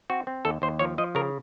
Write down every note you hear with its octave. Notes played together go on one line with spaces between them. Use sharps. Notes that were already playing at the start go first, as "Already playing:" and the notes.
C4 F#4
C4
D#2 A4
D#2 C5
F3 C#5
F3 D#5
C#3 A#4